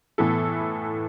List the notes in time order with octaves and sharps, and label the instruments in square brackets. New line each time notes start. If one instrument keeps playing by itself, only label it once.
[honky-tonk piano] A2 E3 B3 E4 A4